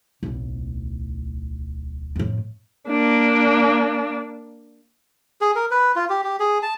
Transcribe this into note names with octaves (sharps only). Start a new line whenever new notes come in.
D1 B1
F2 A2
A#3 D4
G#4
A#4
B4
F4
G4
G4
G#4
A5